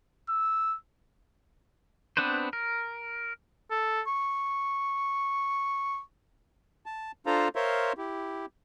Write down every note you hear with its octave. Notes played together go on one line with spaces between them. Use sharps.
E6
B3 C4 D4 B4 C5
A#4
A4
C#6
A5
D4 F4 A4 C5 F5 A#5
A#4 C5 C#5 E5 F5 C6
E4 G4